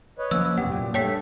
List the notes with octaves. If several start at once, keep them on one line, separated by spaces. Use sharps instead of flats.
B4 C#5 D#5
F3 A#3 C#4 E6
E1 F#2 C3 G4 F#5
A#2
G2 A3 C#5 E5 G5 A5 B6